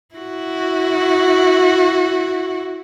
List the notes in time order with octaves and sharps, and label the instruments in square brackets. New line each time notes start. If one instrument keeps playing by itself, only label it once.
[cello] E4 F#4